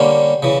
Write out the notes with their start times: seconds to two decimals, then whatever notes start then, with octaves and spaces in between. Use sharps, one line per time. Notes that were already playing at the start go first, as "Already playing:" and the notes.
Already playing: D3 G3 A#3 C#4
0.43 C#3 E3